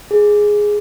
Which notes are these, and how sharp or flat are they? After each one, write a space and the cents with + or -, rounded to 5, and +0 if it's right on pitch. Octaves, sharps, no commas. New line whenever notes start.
G#4 +0